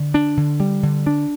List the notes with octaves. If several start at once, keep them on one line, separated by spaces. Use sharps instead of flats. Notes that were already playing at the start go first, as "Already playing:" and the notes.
Already playing: D3
D4
D3
G3
D3
D4